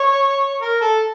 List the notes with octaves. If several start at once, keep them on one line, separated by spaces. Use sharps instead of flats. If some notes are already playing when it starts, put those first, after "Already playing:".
Already playing: C#5
A#4
A4